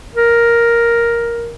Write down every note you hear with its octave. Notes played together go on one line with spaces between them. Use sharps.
A#4